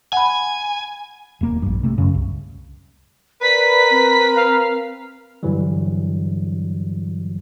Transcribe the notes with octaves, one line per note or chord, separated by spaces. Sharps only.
F#5 G#5 B5
D#1 A#3
A#1 G2
C3 A3
F#2 C#3
C2
A#4 B4 D5 B6
C4
F5
G2 D3 E3 F#3 G3